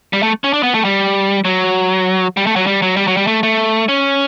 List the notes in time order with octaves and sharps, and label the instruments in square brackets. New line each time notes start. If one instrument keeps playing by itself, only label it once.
[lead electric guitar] G3
A3
C#4
D4
B3
A3
G3
F#3
G3
A3
F#3
G3
F#3
G3
F#3
G3
A3
A3
C#4